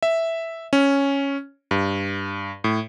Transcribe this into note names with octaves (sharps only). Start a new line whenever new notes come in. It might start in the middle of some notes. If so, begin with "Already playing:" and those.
E5
C#4
G2
A2